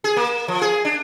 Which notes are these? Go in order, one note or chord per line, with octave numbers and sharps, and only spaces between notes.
G#4
A#3
F3
G#4
D4